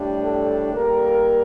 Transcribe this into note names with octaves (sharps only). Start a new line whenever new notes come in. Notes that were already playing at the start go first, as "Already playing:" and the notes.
Already playing: A2 G3 D4
A4
G3 A#3 A#4